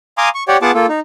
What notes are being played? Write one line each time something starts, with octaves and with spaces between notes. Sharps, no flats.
F5 G#5 A#5 C6 D6 D#6
C#6
G4 C#5 D5 F#5 G5
B3 F4 G#4 F#5 A5 D6
A#3 F4 A4
D#4